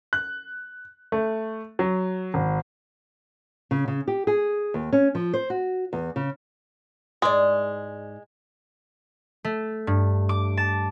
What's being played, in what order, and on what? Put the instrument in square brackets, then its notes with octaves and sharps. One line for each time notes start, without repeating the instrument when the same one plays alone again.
[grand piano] F#6
A3
F#3
G#1
[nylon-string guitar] C#3
C#3
G4
G#4
D#2
C#4
F3
C5
F#4
E2
C#3
[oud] G#2 D5 [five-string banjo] G#3
[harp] A3
G2
D6
A5